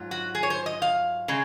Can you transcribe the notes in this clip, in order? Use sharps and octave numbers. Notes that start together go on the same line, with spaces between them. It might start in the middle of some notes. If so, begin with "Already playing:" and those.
Already playing: G#2 F#3 F4
F#4
G#4
C#5
C5
D#5
F5
C#3 G#3